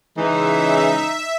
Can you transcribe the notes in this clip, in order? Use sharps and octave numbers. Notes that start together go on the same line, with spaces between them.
C#3 E3 G#3 D#4 E5